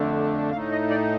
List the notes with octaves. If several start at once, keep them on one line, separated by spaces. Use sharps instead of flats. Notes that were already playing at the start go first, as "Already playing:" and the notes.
Already playing: F2 D3 A3 D4
A2 A3 D#4 F5
D#5
D5